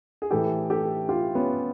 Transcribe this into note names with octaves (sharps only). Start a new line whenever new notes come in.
G#4
A2 E3 G4 A4
G4 A4
F4 G4
B3 C#4